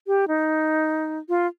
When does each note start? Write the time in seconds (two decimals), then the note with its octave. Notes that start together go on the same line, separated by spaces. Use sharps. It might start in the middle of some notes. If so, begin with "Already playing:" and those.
0.07 G4
0.28 D#4
1.29 F4